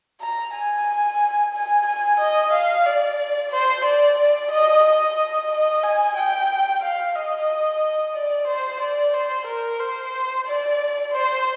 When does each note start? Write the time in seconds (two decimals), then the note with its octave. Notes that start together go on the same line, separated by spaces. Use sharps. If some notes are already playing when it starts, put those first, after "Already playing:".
0.21 A#5
0.55 G#5
1.54 G#5
1.87 G#5
2.20 D#5
2.53 F5
2.86 D5
3.52 C5
3.85 D5
4.18 D5
4.52 D#5
4.84 D#5
5.51 D#5
5.83 G#5
6.17 G5
6.82 F5
7.16 D#5
8.15 D5
8.48 C5
8.81 D5
9.14 C5
9.47 A#4
9.80 C5
10.46 D5
11.12 C5